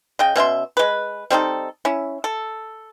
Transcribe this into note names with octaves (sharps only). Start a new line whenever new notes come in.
C#3 D#5 G5
B2 C#4 E5 C6
G#3 B4
G3 C4 D#4 A4
C#4 E4
A4